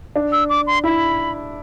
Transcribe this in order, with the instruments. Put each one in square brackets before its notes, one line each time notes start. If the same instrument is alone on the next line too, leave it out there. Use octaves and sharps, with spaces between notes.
[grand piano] D4
[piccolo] E6
D6
C6
[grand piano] E4 [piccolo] B5